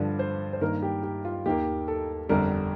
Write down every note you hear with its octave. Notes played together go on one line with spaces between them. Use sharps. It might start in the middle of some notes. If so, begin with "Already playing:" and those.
Already playing: G2 D3 F3 D5
C5
C5
G2 D#3 A#3 A#4
G4
G4
F4
D#2 D#3 A#3 G4
A4
G1 F2 D3 G3 A#4